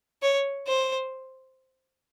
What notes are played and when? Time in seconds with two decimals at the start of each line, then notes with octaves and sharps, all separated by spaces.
0.22 C#5
0.67 C5